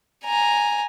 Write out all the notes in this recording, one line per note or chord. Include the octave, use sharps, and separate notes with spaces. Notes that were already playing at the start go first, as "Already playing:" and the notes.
G#5 A#5